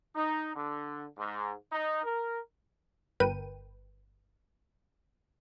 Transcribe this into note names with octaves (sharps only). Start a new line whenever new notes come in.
D#4
D3
G#2
D#4
A#4
G1 A#4 B4 G5 D#7